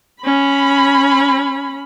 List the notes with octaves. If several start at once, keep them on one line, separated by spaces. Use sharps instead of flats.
C#4 B5